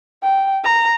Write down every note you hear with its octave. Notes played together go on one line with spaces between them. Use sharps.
G5
A#5